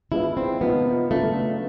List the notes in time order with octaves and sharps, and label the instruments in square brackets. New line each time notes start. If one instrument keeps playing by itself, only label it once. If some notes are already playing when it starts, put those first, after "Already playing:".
[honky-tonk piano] F3 G#3 B3 D4 F4 [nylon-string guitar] E4
[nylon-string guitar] C4
[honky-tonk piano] C3 F3 A#3 D#4 [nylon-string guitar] B3
[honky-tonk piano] C#3 F#3 B3 D4 F4 [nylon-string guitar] A3